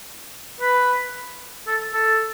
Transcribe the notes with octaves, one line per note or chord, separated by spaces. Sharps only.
B4
A4
A4